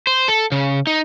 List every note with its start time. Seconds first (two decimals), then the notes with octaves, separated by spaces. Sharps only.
0.07 C5
0.28 A4
0.52 C#3
0.87 D#4